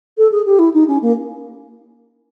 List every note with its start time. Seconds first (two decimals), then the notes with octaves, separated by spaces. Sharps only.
0.18 A4
0.31 G#4
0.46 G4
0.59 E4
0.74 D#4
0.88 C#4
1.02 A#3